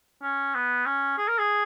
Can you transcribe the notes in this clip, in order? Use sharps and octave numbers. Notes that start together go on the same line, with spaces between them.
C#4
B3
C#4
G#4
A#4
G#4